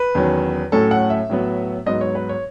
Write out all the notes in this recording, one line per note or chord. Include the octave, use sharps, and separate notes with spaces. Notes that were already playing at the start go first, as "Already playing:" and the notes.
Already playing: B4
E2 D#3 F#3 C#4
A2 F#3 A3 C#4 A4
F#5
E5
A2 F#3 B3
G#2 F#3 B3 D#5
C#5
B4
C#5